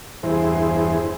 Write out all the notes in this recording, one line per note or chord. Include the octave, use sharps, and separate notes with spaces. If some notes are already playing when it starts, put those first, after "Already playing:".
E2 G2 E4 G#4 C5